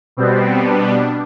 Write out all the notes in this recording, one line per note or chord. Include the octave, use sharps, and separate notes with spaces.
B2 G3 B3 C4
D4